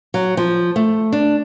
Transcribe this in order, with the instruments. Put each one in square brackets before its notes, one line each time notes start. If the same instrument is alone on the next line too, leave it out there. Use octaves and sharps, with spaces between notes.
[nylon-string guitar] F#3
F3
A3
D4